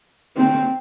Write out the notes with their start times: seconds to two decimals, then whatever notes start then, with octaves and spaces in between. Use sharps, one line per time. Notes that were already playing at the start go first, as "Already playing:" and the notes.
0.37 C4